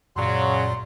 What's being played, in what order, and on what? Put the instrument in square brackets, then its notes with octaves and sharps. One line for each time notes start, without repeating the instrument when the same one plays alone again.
[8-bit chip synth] F#2 A#2 D5 [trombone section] C#3 F#3 [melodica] C6